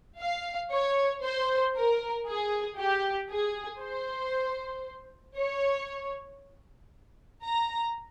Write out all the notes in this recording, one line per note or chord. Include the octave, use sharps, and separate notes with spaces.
F5
C#5
C5
A#4
G#4
G4
G#4
C5
C#5
A#5